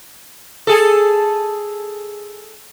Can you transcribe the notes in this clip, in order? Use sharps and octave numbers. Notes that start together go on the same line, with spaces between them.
G#4 A4